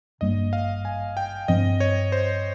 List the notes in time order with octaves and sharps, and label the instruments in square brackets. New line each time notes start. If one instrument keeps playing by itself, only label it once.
[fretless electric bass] G#1 G2 G3 A#3 [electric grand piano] D#5
[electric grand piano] F5
G#5
G5
[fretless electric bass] G2 F3 C4 [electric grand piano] D#5
[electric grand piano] C#5
C5